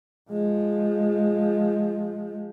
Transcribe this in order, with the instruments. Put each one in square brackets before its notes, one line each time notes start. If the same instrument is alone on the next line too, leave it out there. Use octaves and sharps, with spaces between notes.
[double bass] F3 G#3